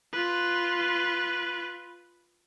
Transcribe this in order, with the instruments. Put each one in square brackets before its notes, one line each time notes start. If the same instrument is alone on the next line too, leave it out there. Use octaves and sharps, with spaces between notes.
[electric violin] F4 B4